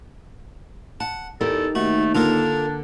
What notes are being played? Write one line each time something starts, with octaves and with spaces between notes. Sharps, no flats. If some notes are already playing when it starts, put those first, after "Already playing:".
F#5 A5
E2 D#4 G4 A4 A#4
D#2 A3 F#4
D3 A#3 D4 F4 A4 A#4